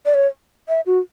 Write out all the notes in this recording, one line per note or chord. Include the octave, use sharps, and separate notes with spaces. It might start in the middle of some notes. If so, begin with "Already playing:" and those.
D5
C#5
E5
F#4